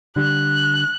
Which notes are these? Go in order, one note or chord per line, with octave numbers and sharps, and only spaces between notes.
D3 G3 F#6